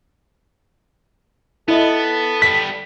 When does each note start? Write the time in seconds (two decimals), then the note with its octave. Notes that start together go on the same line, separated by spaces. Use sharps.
1.68 B3 E4 A4 D#5
2.42 G3 B3 B6